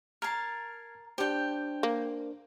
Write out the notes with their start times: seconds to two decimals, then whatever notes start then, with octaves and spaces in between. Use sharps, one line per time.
0.22 A#4 A5 F6 G#6 C7
1.18 D4 G4 C5 G5
1.83 A#3